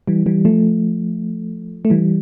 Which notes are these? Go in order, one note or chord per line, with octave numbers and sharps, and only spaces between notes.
E3 G3
E3 G3
F3 A3
A3
E3 G3